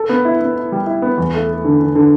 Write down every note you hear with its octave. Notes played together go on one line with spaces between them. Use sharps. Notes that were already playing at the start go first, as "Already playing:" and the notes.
Already playing: A4
B3
E4
B3
E4
G3
E4
B3
E2
A3
A3
D3
D3
D3